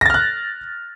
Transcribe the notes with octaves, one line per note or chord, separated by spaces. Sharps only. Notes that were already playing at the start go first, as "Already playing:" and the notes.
F6 F#6 A6 A#6